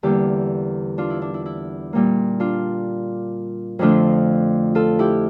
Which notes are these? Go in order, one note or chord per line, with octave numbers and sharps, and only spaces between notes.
E2 D3 G3 A#3 E4 G4
D4 F4
E4
D4
E4
E4
A#2 G3 A#3
D4 F4
F2 D3 F3 A3 D4 F4
F4 A4
E4 G4